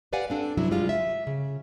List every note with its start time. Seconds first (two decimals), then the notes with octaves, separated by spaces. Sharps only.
0.13 G4 B4 D5 F5 F#5 G#5
0.30 C4 D4 A4
0.57 G2 C3 F#3 D4 E4
0.71 G3 G#3 F4
0.89 E5
1.27 C#3